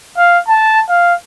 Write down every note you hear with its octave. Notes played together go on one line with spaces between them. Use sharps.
F5
A5
F5